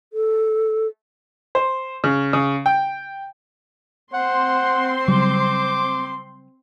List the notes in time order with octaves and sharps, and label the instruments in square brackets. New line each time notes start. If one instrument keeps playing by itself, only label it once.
[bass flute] A4
[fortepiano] C5
C#3
C#3
G5
[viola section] C4 C6 [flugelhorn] C5 [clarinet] F#5
[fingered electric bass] C#3 F#3 G3 [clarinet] D6